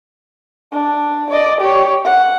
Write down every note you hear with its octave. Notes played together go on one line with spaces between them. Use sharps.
D4
D5 D#5
G4 C#5
F#5